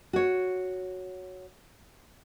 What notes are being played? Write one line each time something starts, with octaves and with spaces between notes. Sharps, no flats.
F#4 C#5